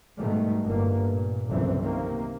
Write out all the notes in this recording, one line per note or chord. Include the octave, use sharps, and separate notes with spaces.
G#2 B2 D#3 G3 A3
G1 A2 A#3
A#2
G1 C2 F#2 C#3 E3 C4
C3 D#3 A#3